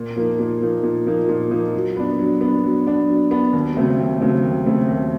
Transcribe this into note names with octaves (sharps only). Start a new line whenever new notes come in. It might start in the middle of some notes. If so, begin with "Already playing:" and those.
Already playing: A#2
F3 A#3 D#4
A#2
F3 A#3 D#4
A#2
F3 A#3 D#4
A#2
F3 A#3 D#4
F#3
B3 D4
F#3
B3 D4
F#3
B3 D4
F#3
B3 D4
D#2
C#3 F#3 A3 C4
D#2
C#3 F#3 A3 C4
D#2
C#3 F#3 A3 C4
D#2